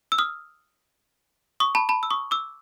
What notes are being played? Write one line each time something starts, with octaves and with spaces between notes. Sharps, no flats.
E6
D#6 F6
C#6 D#6
A5 B5
A5 B5
E6
C#6 D#6
D6 E6